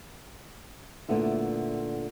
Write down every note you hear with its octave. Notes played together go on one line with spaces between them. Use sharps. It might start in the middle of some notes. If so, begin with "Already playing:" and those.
A#2 D3 A3 B3 E4